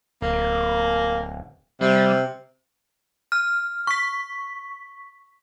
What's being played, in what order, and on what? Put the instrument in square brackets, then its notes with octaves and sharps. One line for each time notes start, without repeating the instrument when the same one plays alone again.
[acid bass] D1 [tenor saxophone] A#3
[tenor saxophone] C3 [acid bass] G3
[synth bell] F6
C#6 B6